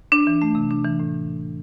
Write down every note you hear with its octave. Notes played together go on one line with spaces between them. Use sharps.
D4
E3
A3
C3
D4
E3
A2